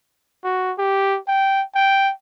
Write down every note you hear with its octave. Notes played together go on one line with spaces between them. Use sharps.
F#4
G4
G5
G5